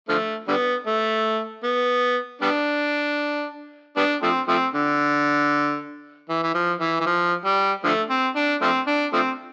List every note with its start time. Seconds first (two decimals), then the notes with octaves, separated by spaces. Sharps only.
0.09 D3 F3 A3
0.48 D3 G3 B3
0.86 A3
1.63 B3
2.42 G3 B3 D4
3.97 G3 B3 D4
4.22 F3 A3 C4
4.48 F3 A3 C4
4.74 D3
6.29 E3
6.43 E3
6.55 F3
6.80 E3
7.00 E3
7.06 F3
7.45 G3
7.84 D3 F3 A3
8.10 C4
8.36 D4
8.61 F3 A3 C4
8.87 D4
9.13 F3 A3 C4